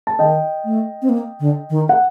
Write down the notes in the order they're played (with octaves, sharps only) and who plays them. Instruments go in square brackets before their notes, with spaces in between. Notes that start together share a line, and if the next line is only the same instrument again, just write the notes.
[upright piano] A5
[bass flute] D#3 [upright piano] D#5 G5
[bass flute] A3
C4
A#3
D3
D#3
[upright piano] F#5